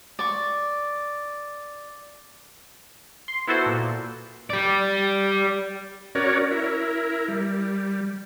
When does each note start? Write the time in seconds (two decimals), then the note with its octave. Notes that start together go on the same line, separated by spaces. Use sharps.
0.19 D5 C#6
3.28 C6
3.47 B3 E4 F#4 A4 C5
3.66 A#2
4.50 G4 D5
6.15 C#4 F#4 A#4 C#5 D5
6.51 E4 A#4
7.28 G3